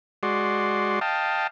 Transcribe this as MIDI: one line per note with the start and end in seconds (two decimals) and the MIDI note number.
0.23 0.99 56
0.23 0.99 66
0.23 0.99 74
0.23 0.99 84
1.01 1.47 75
1.01 1.47 77
1.01 1.47 79
1.01 1.47 81